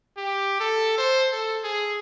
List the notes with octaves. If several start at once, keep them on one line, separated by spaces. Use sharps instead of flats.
G4
A4
C5
A4
G#4